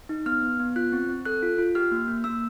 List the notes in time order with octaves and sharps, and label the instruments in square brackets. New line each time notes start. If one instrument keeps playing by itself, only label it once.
[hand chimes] D#4
B3 F6
B3
B3
F4 F#6
C4
C4
A4 F#6
F4
F4
G4 F6
A#3
A#3
A#3 E6